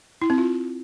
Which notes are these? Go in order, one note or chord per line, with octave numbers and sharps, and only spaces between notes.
E4
C4
F4